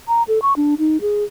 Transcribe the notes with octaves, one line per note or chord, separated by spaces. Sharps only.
A#5
A4
C#6
D4
D#4
G#4